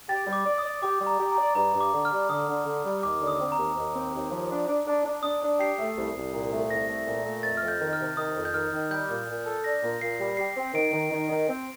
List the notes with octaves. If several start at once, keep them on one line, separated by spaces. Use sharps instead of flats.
G4 A6
G3
D6
D5
D#6
D5
G4 D6
G3
A#5
G4
A#5
D5
G2 A#5
G2
D6
D3
F6
G3
D3 D#6
D3
D3
G3
D#2 D6
D3
D#6
C4
A#5
D#2
D#2
C4
D#2
F3
D4
D4
D4
D4
D4 D#6
D4
G4 C7
A3
C2
C2
A#2
A3
C2 A#6
A3
A#2
A3
F2 A6
F2 F6
G6
D#3
F6
C3
D#3 D#6
F2
G6
D#3 F6
D#3
G3 G6
A#2
A#2
A4
D4 A#6
A#2
A#2 C7
G3
G4 C7
C4
D#3 D7
D#3
D#3
D#3
C4